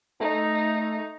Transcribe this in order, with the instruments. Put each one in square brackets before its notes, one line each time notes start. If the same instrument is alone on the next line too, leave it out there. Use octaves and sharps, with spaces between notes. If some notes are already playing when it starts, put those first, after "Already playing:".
[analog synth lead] A3 [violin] D#4